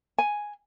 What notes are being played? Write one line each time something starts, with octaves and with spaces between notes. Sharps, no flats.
G#5